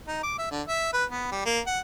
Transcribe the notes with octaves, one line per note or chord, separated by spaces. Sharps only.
D#4
D6
E5
D3
E5
B4
B3
G3
A#3
F#5